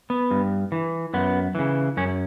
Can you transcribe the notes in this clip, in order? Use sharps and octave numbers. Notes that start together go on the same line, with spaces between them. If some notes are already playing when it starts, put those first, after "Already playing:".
B3
G2
E3
F#2 B3
C#3 E3
F#2 C#4